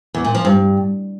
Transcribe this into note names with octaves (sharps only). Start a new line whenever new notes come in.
E2
A#2
F3
G2